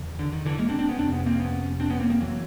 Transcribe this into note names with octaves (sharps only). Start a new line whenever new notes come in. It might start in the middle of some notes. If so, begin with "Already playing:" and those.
Already playing: E2 C#3
D3
D#3
D3 E3
G#3 A#3
C4 D4
C4 D4
B3 C#4
F2 C3 C4 D4
B3 C#4
A#3 C4
B3 C#4
C4 D4
B3 C#4
A#3 C4
A#3 C4
E3 F#3